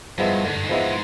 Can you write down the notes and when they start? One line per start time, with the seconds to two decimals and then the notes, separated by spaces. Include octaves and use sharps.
0.18 G2 F3 G#3 B3 E4
0.44 G#2 D3
0.53 G2
0.63 G#2
0.69 F3 G#3 B3 E4